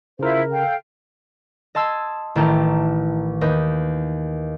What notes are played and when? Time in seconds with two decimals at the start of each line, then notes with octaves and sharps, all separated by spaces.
0.19 C#3 E4 F4 A#4 C5
0.51 A4 F5 G5
1.75 D#5 A5 C6 E6 G#6
2.35 A1 D#3 E4 G5 A5 A#5
3.41 D#2 B4 D#5 G6